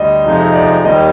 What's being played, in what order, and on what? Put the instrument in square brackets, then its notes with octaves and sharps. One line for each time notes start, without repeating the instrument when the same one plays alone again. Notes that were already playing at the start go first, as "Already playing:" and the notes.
Already playing: [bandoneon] D2 G3 [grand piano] D#5
[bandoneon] F2 C3 F3 G#3 D#4
[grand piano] D5
[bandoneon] D#2 D#3 G3 [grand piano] D#5